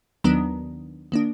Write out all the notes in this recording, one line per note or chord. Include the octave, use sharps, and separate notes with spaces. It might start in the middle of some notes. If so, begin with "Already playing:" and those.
D#2 D#3 F#3 B3 D4 A#5
D#3 A#3 D4